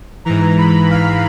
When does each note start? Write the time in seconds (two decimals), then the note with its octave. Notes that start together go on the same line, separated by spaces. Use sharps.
0.25 G#2 E3 A#5
0.58 B5
0.91 F5